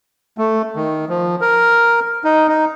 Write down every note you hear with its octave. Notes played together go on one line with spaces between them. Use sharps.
A3
D#3
F3
A#4
D#4
D#4